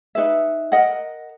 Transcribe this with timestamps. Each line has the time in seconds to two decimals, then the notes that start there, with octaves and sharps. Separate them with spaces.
0.15 D#4 F#4 B4 E5
0.72 A#4 D#5 F#5